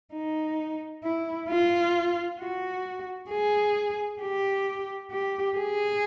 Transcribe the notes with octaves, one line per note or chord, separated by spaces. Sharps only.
D#4
E4
F4
F#4
G#4
G4
G4
G#4